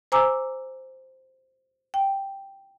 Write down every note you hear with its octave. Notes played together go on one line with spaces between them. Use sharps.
C5 G#5 A#5 D6 E6
G5